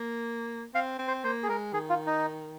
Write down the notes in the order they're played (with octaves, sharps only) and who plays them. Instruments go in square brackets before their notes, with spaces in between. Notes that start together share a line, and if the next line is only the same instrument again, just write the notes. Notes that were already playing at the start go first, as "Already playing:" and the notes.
Already playing: [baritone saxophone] A#3
[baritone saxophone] C4 [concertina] F5
[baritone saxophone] C4
[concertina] C5
[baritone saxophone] A#3 [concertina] C5
[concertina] G#4
[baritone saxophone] G#3 [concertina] A#4
[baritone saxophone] D#3 [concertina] G#4
[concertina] F4
D#4